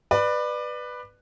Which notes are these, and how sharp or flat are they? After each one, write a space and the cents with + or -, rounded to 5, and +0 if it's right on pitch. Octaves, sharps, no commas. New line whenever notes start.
B4 +0 D5 +25